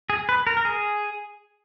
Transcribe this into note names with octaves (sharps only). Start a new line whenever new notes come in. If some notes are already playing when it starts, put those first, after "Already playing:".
G#4
B4
A#4
A#4
G#4